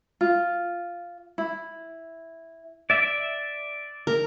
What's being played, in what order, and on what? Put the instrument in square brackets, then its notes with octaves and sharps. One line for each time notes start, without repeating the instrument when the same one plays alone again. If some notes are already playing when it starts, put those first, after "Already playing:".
[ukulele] F4
E4
[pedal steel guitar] D5 E5
[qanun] A#4